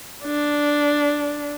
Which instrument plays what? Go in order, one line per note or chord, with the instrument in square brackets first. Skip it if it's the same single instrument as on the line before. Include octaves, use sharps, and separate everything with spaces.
[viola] D4